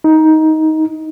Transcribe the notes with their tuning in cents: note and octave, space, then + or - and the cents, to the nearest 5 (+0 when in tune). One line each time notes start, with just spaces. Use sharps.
D#4 +15